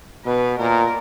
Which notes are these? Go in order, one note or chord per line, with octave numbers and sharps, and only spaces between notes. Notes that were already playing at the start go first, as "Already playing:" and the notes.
B2 B4
A#2 A#4